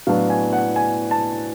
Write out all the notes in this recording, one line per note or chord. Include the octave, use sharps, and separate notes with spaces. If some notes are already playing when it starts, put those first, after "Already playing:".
A2 F#3 B3 D4 F5
G#5
F#5
G#5
A5